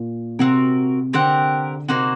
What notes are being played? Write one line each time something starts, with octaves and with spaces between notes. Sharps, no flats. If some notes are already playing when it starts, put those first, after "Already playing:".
Already playing: A#2
C3 C4 F#4 A#4
D3 C4 G4 A#4 F#5
C3 A#3 D#4 F#4 C5